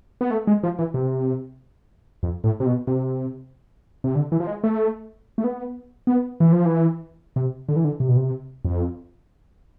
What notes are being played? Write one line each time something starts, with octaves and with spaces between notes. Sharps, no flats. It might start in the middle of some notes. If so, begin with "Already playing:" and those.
B3
A3
G#3
F3
E3
C3
F2
A2
C3
B2
C3
C3
D3
E3
F3
G#3
A3
A3
B3
B3
E3
F3
E3
C3
D3
E3
D3
C3
B2
C3
F2